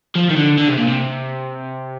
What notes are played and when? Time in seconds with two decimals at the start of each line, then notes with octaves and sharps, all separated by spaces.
0.15 F3
0.30 D#3
0.36 D3
0.58 D3
0.68 C3
0.78 A#2
0.88 C3